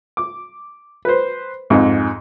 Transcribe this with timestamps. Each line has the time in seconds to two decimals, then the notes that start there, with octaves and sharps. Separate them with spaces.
0.17 D6
1.05 B4 C5
1.70 F2 G#2